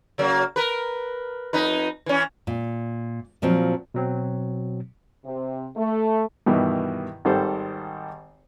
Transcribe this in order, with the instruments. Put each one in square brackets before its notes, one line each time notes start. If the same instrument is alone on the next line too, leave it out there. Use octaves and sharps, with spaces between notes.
[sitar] C#3 F#3 A#3
A#4 B4
F2 D#4 B4
E3 C#4
[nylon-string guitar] A#2
A#2 F3 F#3 C4
[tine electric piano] B2 F#3 C4
[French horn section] C3
A3
[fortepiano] G2 B2 D#3 E3
G#1 D#3 G3 G4 A4 C5